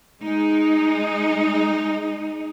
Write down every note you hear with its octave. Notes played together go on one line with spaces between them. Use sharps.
G#3 D#4